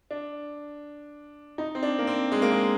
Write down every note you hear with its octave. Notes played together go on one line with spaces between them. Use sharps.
D4
D#4
C4
D4
A#3
C4
G#3
A#3
G#3